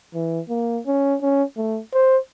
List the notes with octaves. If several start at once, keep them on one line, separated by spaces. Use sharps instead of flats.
E3
A#3
C#4
C#4
A3
C5